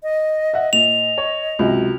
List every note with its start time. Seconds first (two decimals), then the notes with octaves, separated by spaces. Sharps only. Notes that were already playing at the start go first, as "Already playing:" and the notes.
0.03 D#5
0.54 E5 F#5
0.73 A#2 D#5 F7
1.18 C#5
1.59 C#2 C3 F#3